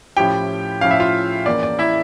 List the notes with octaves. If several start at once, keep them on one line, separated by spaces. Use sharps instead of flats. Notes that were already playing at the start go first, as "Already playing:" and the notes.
A2 F3 C#4 E4 G4 G5
A2 F3 C#4 E4 F5
E5
F4 F5
E2 E3 A#3 C#4 D5
D5
E4 E5